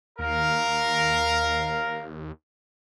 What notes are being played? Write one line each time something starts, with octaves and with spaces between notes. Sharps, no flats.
D#2 A#4 F5